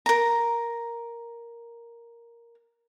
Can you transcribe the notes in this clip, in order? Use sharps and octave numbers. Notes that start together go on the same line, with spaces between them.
A#4 A#5